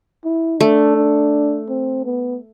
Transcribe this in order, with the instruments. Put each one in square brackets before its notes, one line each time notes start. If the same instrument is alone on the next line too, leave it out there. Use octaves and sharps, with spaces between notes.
[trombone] E4
[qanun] A3 [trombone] D4
[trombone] D4
C4
B3